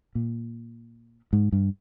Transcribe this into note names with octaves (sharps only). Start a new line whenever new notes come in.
A#2
G#2
G2